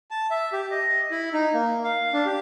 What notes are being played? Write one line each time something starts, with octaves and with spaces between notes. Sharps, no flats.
A5
E5
G4
D#5
E4
D#4
A#3
F5
D4
G4